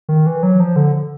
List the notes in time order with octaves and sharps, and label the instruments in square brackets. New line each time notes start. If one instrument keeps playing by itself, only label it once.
[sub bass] D#3
E3
F#3
F3
D3